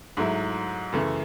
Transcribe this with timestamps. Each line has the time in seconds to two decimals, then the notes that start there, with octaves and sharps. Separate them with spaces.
0.17 G#2 F#3 A3 E4
0.92 F#2 C#3 E3 A3